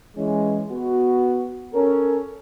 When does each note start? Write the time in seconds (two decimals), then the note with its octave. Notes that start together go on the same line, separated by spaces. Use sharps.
0.17 E3 G#3 C#4
0.71 B3 F#4
1.74 C#4 A4 A#4